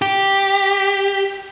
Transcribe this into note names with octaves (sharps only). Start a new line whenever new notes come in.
G4